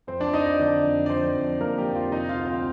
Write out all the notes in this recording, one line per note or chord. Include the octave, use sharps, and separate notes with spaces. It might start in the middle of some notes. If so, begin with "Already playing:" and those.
F2 C4 C5
D4 D5
F3 D#4 D#5
D5
D#5
D3 D4 D5
F2
D5
F2 C4 C5
F2
F2 A#3 A#4
G4
F2
F4
C3 D#4 D#5
F4 F5
D2
C4 C5